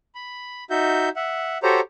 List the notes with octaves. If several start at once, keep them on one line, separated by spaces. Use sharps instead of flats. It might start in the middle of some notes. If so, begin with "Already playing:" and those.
B5
D#4 F#4 E5 G6
E5 F#5
F#4 G4 A4 C5 C#5 A#5